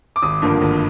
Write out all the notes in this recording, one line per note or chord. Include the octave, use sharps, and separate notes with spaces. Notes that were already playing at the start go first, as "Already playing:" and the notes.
D6
G#1 D#6
G2 D3 F3 A#3
G#1